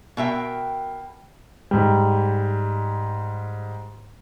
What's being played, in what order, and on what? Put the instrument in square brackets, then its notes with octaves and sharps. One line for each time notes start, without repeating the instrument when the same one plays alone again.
[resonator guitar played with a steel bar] B2 A#4 E5 G5
[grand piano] G#2 G3